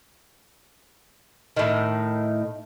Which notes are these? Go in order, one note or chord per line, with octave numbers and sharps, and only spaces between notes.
A2 D#3